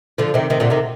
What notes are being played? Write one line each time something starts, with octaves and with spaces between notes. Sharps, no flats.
D3 F3
C3 D#3
C3 D#3
A#2 D3
C3 D#3